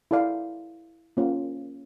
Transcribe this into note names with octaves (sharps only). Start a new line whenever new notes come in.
E4 A4 D5 F5
A#3 C#4 F4